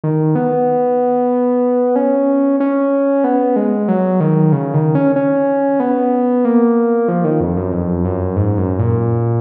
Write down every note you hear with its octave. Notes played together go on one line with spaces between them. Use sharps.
D#3
B3
C#4
C#4
B3
G#3
F#3
D#3
C#3
D#3
C#4
C#4
B3
A#3
F3
D#3
F2
F#2
F2
F#2
G#2
F#2
A#2